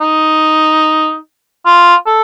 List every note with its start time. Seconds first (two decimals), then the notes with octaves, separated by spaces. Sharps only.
0.01 D#4
1.66 F4
2.07 A4